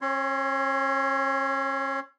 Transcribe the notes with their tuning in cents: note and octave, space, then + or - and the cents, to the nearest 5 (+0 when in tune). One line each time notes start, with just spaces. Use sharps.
C#4 -40 C#5 +0 C6 +0